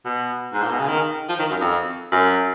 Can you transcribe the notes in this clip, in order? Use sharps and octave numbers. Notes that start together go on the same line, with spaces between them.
B2
G#2
A#2
B2
C#3
D#3
F3
D#3
F#2
F2
F#2